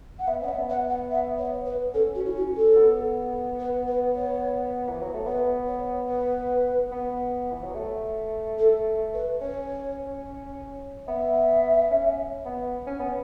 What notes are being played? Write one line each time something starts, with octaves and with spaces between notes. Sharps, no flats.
F#5
B3 E5
C#4 C#5
E5
B3
F#5
F#5
E5
C#5
B4
C#4 A4
F#4
C#4
E4
F#4
A4
B3
B4
B4
C#5
E3
F#3
A3
B3 B4
C#5
B4
B3
E3
F#3
A3
A4
B4
C#4 C#5
B3 E5
C#4
B3
C#4
B3